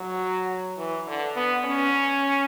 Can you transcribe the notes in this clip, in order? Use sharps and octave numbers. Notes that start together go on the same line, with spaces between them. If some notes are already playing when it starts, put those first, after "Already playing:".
Already playing: F#3
E3
D3
B3
C#4